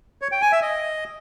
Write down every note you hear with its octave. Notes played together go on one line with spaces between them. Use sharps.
C#5
G5
G#5
E5
D#5